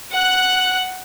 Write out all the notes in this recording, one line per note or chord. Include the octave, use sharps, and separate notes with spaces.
F#5 F#6